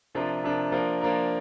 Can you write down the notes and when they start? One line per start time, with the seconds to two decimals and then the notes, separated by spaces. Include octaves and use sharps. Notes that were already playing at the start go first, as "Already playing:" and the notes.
0.15 C3 F3 D4 F4 A#4
0.43 C3 F3 D4 F4 A#4
0.72 F3 A#3 D4 A#4
1.01 F3 A#3 D4 A#4